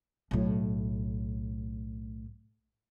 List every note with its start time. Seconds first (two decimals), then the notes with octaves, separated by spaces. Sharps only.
0.31 B1 A2